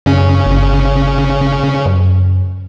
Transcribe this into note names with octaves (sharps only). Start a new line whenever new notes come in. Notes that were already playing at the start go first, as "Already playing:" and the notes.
F#2 C#3 C#4
G1
F#2